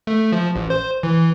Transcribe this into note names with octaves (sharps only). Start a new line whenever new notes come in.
A3
F3
A1
C5
E3